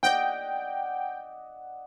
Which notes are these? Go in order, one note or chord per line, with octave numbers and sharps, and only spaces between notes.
D5 D#5 F#5 G5